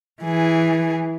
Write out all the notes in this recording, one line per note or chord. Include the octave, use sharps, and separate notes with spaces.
E3 G#4